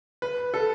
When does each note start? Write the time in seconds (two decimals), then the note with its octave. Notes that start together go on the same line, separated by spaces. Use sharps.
0.22 B4
0.54 A4